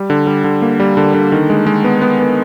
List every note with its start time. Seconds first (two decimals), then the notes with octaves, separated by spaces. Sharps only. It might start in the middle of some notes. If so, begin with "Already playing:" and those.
Already playing: G3
0.10 D3
0.27 G3
0.44 D3
0.62 A#3
0.80 G3
0.97 D3
1.14 D3
1.32 D#3
1.50 G#3
1.66 G#3
1.84 B3
2.02 B3
2.20 B3